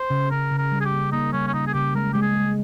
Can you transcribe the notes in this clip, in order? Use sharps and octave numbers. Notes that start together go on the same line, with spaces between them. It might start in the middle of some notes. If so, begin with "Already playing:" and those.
Already playing: C5
C#3
C#3 A#4
C#3
A#4
G3
G#4
G4
A#3
A#3 D#4
G3 C#4
C#4
C#3 D#4
G#4
C#3 G4
G#3 A#4
G#3 G4
G#4
G#3